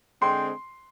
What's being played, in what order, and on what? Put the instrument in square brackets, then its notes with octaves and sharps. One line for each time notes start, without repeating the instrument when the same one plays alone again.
[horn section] D3 G#3 C4 [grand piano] C6